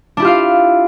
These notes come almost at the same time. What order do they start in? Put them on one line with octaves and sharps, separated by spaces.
D4 E4 G4 F4 F5